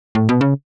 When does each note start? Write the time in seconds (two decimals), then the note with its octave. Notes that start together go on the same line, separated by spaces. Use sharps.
0.15 A2
0.29 B2
0.41 C#3